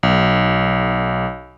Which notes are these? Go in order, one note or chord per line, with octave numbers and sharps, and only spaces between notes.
B1